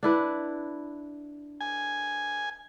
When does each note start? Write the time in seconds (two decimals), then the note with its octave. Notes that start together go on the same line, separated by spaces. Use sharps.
0.03 D4 E4 B4
1.61 G#5